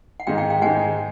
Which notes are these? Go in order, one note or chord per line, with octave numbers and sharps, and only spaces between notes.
F#5
G#2 D#3 G#3 F5 G5
F5 G5
F5 G5
G#2 D#3 G#3 F#5 G#5